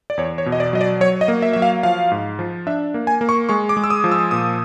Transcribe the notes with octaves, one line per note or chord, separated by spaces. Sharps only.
D5
E2 C#5
C#5
B2
D#5
D5
F#3 D#5
D5
F#3 C#5
D#5
A#3
E5
F#3 E5
F5
F3 F5
G#2
F3
D4 E5
A#3
G#5
A#3
C#6
G#3 C#6
D6
G#3
E6
D#6
F3
E6
A#2 D#6